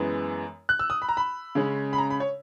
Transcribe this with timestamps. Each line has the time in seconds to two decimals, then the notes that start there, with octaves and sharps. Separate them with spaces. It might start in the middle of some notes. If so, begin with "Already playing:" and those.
Already playing: F#2 E3 G#3 B3
0.69 F#6
0.79 E6
0.90 D#6
1.02 B5
1.09 A#5
1.17 B5
1.55 C#3 G#3 C#4
1.93 B5
1.98 A#5
2.10 B5
2.20 C#5